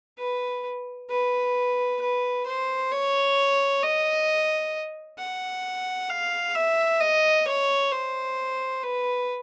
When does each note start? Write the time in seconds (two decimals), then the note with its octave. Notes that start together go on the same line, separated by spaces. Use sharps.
0.18 B4
1.10 B4
2.01 B4
2.46 C5
2.91 C#5
3.83 D#5
5.18 F#5
6.10 F5
6.55 E5
7.00 D#5
7.46 C#5
7.91 C5
8.83 B4